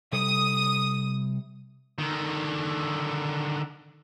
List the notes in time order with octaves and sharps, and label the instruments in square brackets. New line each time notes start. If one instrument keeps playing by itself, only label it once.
[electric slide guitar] C3 G3 A4 [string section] D#6
[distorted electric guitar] D3 D#3